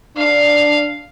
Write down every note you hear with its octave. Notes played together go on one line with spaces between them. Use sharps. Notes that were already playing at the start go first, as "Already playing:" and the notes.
D4 F5